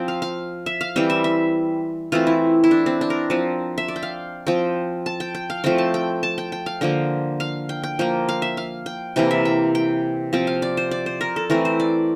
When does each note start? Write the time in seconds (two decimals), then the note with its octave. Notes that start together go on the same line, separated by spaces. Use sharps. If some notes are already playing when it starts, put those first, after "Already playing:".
Already playing: F3 C4 G5
0.08 F5
0.22 F5
0.66 E5
0.81 F5
0.96 E3 G3 C4 G5
1.10 E5
1.24 E5
2.12 E3 A3 C4 F4
2.27 E4
2.64 E4
2.71 D4
2.86 C4
3.01 D4
3.10 A#4
3.30 F3 C4
3.78 E5
3.88 D5
3.96 G5
4.03 F5
4.47 F3 C4 G5
5.06 A5
5.20 G5
5.35 G5
5.50 F5
5.64 F3 A3 C4 G5
5.78 A5
5.94 G5
6.23 A5
6.38 G5
6.52 G5
6.66 F5
6.81 D3 F3 A#3 G5
7.40 F5
7.69 G5
7.83 G5
7.99 F3 A#3 G5
8.29 F5
8.42 E5
8.57 F5
8.86 G5
9.16 C3 E3 A#3 G5
9.31 E5
9.45 G5
9.75 G5
10.33 F3 C4 G5
10.47 F5
10.62 D5
10.77 C5
10.91 D5
11.06 C5
11.21 A#4
11.36 A4
11.50 E3 A3 C4 A#4
11.65 C5
11.80 D5